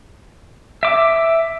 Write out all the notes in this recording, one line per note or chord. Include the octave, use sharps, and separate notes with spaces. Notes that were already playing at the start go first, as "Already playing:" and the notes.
E5 D6